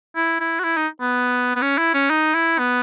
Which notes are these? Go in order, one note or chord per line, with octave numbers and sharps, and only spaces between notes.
E4
E4
F#4
E4
D#4
B3
B3
C#4
E4
C#4
D#4
E4
B3